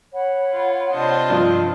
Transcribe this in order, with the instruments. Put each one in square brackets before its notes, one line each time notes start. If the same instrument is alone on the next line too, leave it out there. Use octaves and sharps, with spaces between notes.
[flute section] C#5 F#5 B5
[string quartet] F4
[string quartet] C3 D4 F4 [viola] C5 D#5
[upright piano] G2 F3